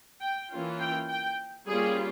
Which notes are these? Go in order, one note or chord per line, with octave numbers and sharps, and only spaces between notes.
G5
E3 A#3 C#4 F4
G5
G5
G3 A#3 C#4 F4 G#4